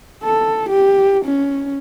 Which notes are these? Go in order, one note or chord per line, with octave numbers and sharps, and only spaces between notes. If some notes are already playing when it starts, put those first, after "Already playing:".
A4
G4
C#4